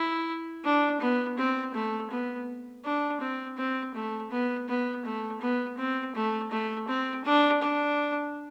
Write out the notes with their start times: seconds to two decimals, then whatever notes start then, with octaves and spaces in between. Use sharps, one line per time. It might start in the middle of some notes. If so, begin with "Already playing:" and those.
Already playing: E4
0.64 D4
1.00 B3
1.38 C4
1.74 A3
2.10 B3
2.84 D4
3.21 C4
3.57 C4
3.95 A3
4.30 B3
4.68 B3
5.05 A3
5.41 B3
5.77 C4
6.15 A3
6.51 A3
6.87 C4
7.25 D4
7.61 D4